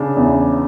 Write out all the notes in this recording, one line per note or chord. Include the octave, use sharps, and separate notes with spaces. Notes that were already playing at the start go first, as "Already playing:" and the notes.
Already playing: C#3 D4
E2